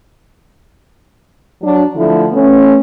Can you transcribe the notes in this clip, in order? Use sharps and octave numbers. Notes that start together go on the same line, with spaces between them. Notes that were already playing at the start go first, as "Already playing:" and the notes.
F#3 D4
D3 F3 A3 E4
A3 B3 C#4